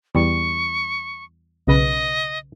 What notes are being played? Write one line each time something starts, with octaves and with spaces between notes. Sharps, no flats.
E2 G3 C#6
B1 C#3 B4 D#5